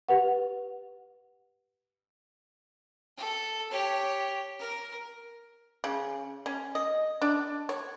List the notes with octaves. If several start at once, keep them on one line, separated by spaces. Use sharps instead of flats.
G4 B4 F#5
A4
G4 C#5
A#4
C#3
C#4
D#5
D4
C#5